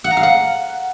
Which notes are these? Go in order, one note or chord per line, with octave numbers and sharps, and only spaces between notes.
F#5
A#5
F5
F#5